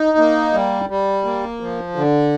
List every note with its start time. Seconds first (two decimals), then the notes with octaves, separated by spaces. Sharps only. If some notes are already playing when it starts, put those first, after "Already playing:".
Already playing: D#4
0.18 A#3
0.53 G3
0.90 G3
1.25 A#3
1.61 F3
1.96 D3